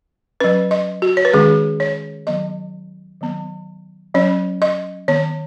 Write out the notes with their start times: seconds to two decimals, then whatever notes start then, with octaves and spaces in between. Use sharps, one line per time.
0.40 F#3 C#4 B4
0.71 D#5
1.02 F#4
1.17 C#5
1.25 B4
1.33 D#3 G#3 C#4 G#4
1.80 C#5
2.27 D#3 F#3 B3 D#5
3.21 D#3 F#3 B3
4.14 F#3 C#4 C#5
4.62 D#5
5.08 D#3 B3 C#5